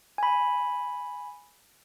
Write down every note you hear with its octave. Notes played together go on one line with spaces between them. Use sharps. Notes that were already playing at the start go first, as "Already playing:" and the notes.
G#5 B5